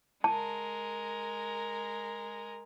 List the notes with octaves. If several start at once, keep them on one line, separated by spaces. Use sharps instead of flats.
G#3 A#4 A5